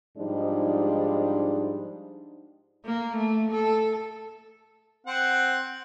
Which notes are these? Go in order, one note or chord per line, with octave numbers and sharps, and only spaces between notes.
G#2 F3 G3 G#3 D4 D#4
A#3
A3
A4
C4 F#5